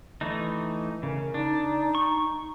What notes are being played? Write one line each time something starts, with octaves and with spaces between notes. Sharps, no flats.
E3 A3 D#4
C#3 A#4
D4 D#4
C#6